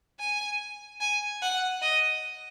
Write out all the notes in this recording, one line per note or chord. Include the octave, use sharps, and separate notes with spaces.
G#5
G#5
F#5
D#5